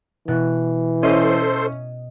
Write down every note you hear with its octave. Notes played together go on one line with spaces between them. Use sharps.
B2 E3 F#6
C#4 E4 A4 C5 D#5 C6